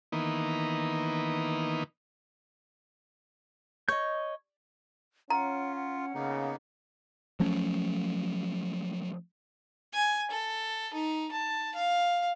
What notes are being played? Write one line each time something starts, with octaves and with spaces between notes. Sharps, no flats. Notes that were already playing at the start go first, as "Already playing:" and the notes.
D#3 E3 A#3 B3 D#4
C#5 D#5 G6
C#4 F4 F#5 A#5
F#5
C#3 A#3 B3 D#4
F3 F#3 A3 C#4
G#5
A4
D#4
A5
F5